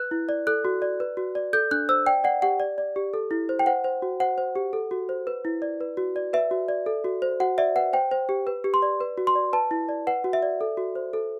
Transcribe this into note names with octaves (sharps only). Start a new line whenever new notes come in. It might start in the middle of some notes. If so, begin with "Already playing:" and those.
Already playing: B4 F#6
E4
D5
A4 F#6
F#4
D5
B4
F#4
D5
A4 G6
D4 F#6
C5 E6
D5 G5
D5 F#5
G4 F#5
D5
D5
G4
A4
E4
C5
G5
C5 F#5
C5
F#4
C5 F#5
C5
G4
A4
F#4
C5
B4
E4
D5
B4
F#4
D5
B4 E5
F#4
D5
A4
F#4
C5
F#4 F#5
D5 E5
B4 F#5
C5 G5
C5
G4
B4
G4
C6
D5
B4
F#4
C6
D5
B4 A5
E4
D5
B4 F#5
F#4
E5
D5
A4
F#4
C5
A4